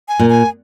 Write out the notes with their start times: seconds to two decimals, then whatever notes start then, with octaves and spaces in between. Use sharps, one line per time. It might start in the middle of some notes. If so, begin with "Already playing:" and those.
0.08 G#5
0.19 A#2
0.30 G#5